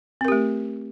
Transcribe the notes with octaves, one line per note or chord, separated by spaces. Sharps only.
A3 C4 G4 A#4